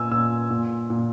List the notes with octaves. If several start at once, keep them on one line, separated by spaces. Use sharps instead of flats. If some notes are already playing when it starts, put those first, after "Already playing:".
Already playing: A#2 G#5 E6
A#2 E6
A#2
A#2